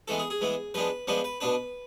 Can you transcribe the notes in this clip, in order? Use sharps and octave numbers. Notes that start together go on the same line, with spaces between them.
E3 G#3 B3 A4
G#4
G#4
E3 G#3 B3
F3 G#3 B3 D4 B4
F3 G#3 B3 D4 B4
B4
B2 B3 D4 B4